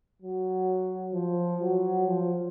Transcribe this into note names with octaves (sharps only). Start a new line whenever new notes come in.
F#3
F3
F#3
F3